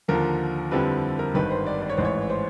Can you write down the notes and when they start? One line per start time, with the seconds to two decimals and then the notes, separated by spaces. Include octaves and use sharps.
0.08 D#2 D3 F3 A#4
0.71 F2 D3 G3 C4 E4 B4
1.19 A#4
1.34 G#1 G2 D#3 B4
1.51 C5
1.66 D5
1.82 D5
1.90 C#5
1.97 A1 G#2 E3 C5
2.05 C#5
2.30 C5